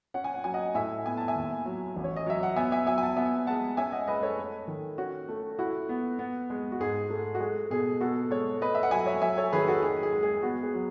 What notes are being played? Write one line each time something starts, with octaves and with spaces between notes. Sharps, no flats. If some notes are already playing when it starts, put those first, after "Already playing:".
C#4 F#5
G#5
F#5
F#3 G#5
D#5 F#5
A2 E5 G#5
B3 G#5
A5
E5 G#5
D#2
F#3
A1
C#5
D#5
F#3 E5
F#5
B3 E5 G#5
E5 G#5
F#3 E5 G#5
G#5
F#5 A5
B3 E5 G#5
G#3 F#5 A5
C#4 E5 G#5
D#5 F#5
G#3 B4 D#5
A4 C#5
A3
D#3
C#4 F#4
A3
E4 F#4
B3
B3
G#3
F#4
G#2 G#4
A3
F#4
G#3 G#4
B2 G#4
B3 F#4 A4
G#3 A4 C#5
A3 B4 D#5
E5
F#5
F#3 E5 G#5
C#5 E5
F#3 E5 G#5
A4 C#5
D#3 G#4 B4
F#4 A4
D#4 G#4
G#4
G#3
G#4
B3 F#4
G#4
F#3